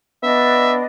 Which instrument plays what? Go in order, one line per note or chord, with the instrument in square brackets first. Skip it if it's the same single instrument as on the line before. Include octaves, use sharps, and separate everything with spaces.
[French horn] B3 [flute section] D4 D#5 [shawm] E5